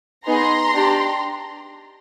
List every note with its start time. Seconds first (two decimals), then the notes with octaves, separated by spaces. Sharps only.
0.26 B3 D#4 G#4 A#5 C6
0.74 D4 G4